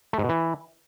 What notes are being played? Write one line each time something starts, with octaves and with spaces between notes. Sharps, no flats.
A3
G#2
B2
E3